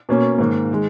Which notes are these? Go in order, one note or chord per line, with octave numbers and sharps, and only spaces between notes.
B2 A#3 C#4
G#2 D#3 A#3
D#3 G#3